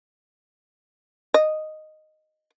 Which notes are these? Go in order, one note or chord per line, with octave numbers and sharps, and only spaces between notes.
D#5